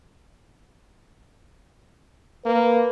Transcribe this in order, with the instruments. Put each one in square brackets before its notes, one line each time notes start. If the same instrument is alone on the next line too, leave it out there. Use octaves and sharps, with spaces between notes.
[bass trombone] A#3 [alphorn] B4